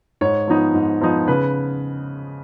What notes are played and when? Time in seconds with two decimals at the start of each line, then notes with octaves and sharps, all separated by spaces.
0.21 G#2 C#5
0.48 F3 B3 D#4
0.74 G#2
1.01 F3 B3 D#4
1.28 C#3 B4